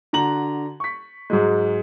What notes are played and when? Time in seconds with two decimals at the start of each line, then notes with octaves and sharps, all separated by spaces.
0.13 D3 F#4 A#5 F#7
0.80 C#6 B6
1.30 G#2 F#3 G#3